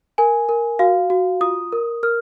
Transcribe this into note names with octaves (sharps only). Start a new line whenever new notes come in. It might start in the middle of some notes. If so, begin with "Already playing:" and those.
A#4 G#5
A#4
F#4 F5
F#4
F4 D#6
A#4
A#4 F6